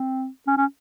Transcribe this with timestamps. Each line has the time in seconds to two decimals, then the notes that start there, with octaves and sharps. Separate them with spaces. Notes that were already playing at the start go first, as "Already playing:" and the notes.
Already playing: C4
0.47 C#4
0.57 C#4